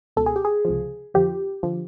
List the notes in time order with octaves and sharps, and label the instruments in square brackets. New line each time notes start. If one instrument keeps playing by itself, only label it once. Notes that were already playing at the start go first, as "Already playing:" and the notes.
[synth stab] C#2 B2 A4
G#4
G4
G#4
C#2 C3 F3
F2 D3 F3 G4
D3 F3